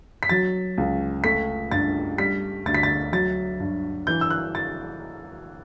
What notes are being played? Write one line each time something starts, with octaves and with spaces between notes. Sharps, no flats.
B6
F#3 A6
C#2
A3 B6
G2 A6
G3 B6
D2 A6
B6
A6
F#3 A6
G2
E3 G6
E6
F#6
A6